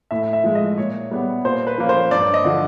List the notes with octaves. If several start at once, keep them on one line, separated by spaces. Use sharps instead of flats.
A2 E5
E5
F3 G#3
D#5
A#2 C#5
G3 B3
A#2 C5
B4
F3 A#3 C#4
C5
G2 D5
D#5
D3 F3